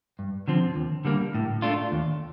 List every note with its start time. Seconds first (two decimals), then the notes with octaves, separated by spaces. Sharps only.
0.19 G2
0.48 D3 F3 C4
0.76 D#2
1.05 D3 G3 A#3
1.35 A2
1.62 A3 D4 F4
1.92 D#2